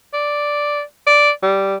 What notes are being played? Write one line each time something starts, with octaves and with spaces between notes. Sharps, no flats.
D5
D5
G3